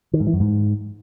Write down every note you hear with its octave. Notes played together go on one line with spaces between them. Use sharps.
D#3
G#2
E3
F#2
G#2